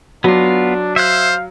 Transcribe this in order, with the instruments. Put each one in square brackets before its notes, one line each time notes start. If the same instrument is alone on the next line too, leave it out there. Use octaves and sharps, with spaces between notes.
[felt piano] F#3 [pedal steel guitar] B3 F4 [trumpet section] D4
[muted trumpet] C5 [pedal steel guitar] E5 F#6 [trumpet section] F5